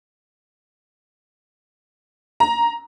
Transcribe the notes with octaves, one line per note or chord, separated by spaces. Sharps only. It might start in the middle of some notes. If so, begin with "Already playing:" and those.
A#5